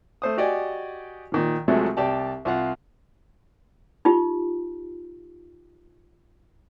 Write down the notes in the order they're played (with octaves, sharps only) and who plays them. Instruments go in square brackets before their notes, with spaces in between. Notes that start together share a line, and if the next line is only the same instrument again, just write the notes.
[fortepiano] A3 C5 D#6
F#4 G4 D5 D#5 G#5
A#2 D#3 F3
C2 C3 F3 F#3 G#3 A3
C2 G4 D5 A5
C2 F4 F#5 F6
[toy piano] D#4 F4 G4